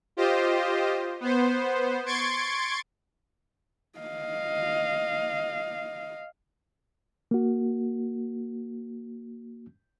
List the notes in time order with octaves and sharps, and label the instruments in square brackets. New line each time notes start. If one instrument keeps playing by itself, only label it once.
[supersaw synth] F4 G4 C5 D#5
B3 C5
C6 C#6 G#6 A6 D7
[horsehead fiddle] D#5 F5
[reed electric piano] A#3 F#4